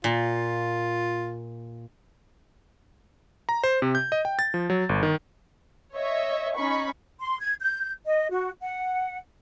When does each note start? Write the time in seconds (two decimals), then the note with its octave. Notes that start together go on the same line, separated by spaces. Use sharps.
0.04 A#2 F4
3.49 A#5
3.64 C5
3.82 C3
3.95 G6
4.12 D#5
4.25 G5
4.39 A6
4.54 F3
4.70 F#3
4.89 G1
5.03 D#3
5.95 C#5 D#5 E5
6.56 C#4 D#4 B5 C#6
7.20 C6
7.39 G#6
7.61 G6
8.07 D#5
8.31 F#4
8.62 F#5